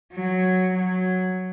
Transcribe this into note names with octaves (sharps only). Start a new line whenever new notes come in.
F#3
F#3